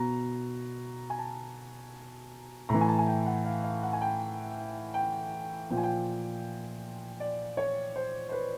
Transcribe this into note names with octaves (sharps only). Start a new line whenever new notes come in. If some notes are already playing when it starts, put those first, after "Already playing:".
Already playing: B2 A#5
G#5
A5
A2 E3 A#5
G#5
A5
G#5
G5
F#5
F5
F5
F#5
G#5
G5
G5
A#2 F3 G5
G#5
G5
D5
C#5
C5
C5
B4